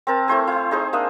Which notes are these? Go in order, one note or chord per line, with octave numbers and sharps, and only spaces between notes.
C4 A#4 A5
A3 E4 C5 G#5
E4
D#4 G#4 C5
A#3 D4 E5 D#6